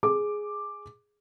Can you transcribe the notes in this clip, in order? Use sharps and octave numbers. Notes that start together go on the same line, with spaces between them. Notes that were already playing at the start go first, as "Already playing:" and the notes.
G#4 D6